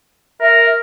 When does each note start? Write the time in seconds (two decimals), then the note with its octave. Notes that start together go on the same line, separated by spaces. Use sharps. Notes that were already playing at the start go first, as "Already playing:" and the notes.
0.41 A#4 E5